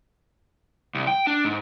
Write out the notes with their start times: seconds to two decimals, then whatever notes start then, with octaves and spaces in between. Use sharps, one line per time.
0.95 C2
1.07 G5
1.27 D4
1.45 G#2